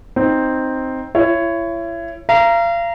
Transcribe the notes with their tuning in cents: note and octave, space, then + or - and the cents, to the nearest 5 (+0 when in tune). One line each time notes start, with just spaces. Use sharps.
C4 +0 D#4 +0
E4 +35 C#5 +0
F5 -35 A#5 +0